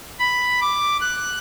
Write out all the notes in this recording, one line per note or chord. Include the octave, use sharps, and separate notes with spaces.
B5
D6
F#6